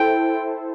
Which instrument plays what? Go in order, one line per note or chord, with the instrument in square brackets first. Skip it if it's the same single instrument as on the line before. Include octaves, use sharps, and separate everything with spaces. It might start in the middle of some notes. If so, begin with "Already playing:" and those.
Already playing: [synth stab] E4 A4 C5 [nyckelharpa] G5